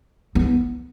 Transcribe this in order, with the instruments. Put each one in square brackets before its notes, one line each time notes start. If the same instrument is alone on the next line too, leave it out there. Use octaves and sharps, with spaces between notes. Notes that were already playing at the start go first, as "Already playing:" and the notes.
[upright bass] B3